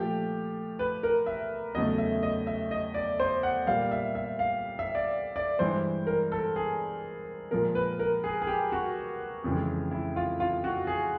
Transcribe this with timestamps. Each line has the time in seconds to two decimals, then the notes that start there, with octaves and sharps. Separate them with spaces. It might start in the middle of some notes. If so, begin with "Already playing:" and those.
Already playing: A#2 F3 A3 G4
0.79 B4
1.03 A#4
1.26 E5
1.75 E2 C#3 F#3 A3 D#5
1.98 E5
2.23 D#5
2.47 E5
2.71 D#5
2.94 D5
3.20 C5
3.43 F#5
3.67 A#2 G3 A#3 F5
3.91 E5
4.15 E5
4.39 F5
4.79 E5
4.95 D5
5.36 D5
5.59 G2 E3 G#3 C5
6.07 A#4
6.32 A4
6.56 G#4
7.51 A#2 F3 G#3 A#4
7.75 B4
7.99 A#4
8.24 G#4
8.42 G#4
8.47 G4
8.72 F#4
9.44 F2 C#3 E3 G#3
9.91 E4
10.16 F4
10.40 F4
10.64 F#4
10.87 G#4